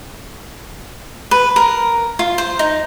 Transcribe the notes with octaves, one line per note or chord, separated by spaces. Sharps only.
B4
A#4
F4
C5
D#4